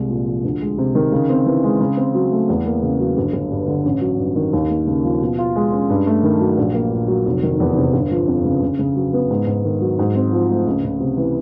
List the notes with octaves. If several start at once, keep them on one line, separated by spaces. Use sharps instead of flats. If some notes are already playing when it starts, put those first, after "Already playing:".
Already playing: C2 G#3
A#2
F3
D2
G#3
C3
D#3
C#3
C4
E3
G#3
C#3
C4
F#3
A3
E2
A#3
C#3
F#3
G1
G1
G2
D3
A1
F#3
G2
D#3
D#2
A#3
C#3
F3
B2
F4
G#3
C#4
G2
A3
D#3
F#3
A#1
A#3
A#2
F#3
F1
D#3
E2
C3
G1
F3
F2
C#3
C#3
C#3
F#3
B3
G#2
G#2
D#3
F#3
G#2
C4
F3
A3
C#2
C#2
C3
E3